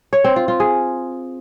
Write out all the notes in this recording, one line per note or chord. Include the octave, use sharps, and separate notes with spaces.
C#5
C4
F4
F4
G#4